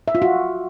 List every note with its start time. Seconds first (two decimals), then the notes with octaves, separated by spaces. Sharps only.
0.08 E5
0.15 F4
0.22 F#4